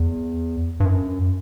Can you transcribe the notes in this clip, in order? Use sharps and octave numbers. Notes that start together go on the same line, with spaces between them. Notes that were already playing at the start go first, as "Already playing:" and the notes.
Already playing: E2
G2
F#2